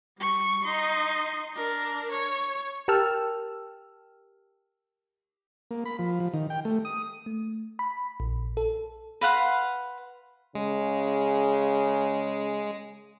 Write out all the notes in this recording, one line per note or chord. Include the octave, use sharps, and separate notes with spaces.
G3 C#6
D#4 C6
D4 A#4
C#5
G4 A#4 G5 A5 E6 F6
A#3
B5
F3
F3
D#3
G5
A3
D#6
A3
B5
A#1
A4
B4 F5 F#5 C6
C#3 G#3